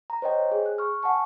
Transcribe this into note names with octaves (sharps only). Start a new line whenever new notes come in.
A#5
C5 C#5 D#5 G5
G#4
F#6
C#6 F6
F#5 G#5 A5 C#6